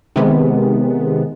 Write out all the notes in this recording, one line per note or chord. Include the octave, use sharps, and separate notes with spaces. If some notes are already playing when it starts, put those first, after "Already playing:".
C3 D#3 G#3 B3